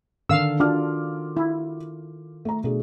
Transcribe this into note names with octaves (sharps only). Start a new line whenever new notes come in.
D3 D#3 A4 A#4 F5 E6
D4 F4 F#4 A#4 D6 F6
E4
A3 A#5
B2 A3 D4 G#4